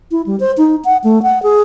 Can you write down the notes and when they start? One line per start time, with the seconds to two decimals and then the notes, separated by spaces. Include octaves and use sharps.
0.11 E4
0.26 G3
0.40 C5
0.58 D#4
0.85 F#5
1.04 A3
1.23 F#5
1.43 G#4